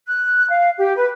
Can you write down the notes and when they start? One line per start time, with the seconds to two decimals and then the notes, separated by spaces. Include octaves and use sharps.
0.07 F#6
0.50 F5
0.78 G4
0.96 B4